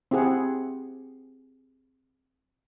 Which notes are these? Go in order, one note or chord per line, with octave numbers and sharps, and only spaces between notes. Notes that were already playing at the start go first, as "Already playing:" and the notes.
C4 E4 G4 G#4 F#5